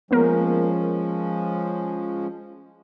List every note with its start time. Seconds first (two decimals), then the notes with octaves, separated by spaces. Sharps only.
0.11 F3 G#3 A#3 B3 C#4 A#4